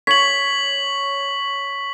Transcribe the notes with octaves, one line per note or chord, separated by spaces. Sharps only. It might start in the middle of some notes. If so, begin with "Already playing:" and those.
C#5 B6 F#7